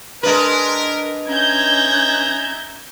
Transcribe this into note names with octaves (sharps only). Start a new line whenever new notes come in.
G#3 D4 A#4 B4
C#4 D#4 E5 A#5 G6 G#6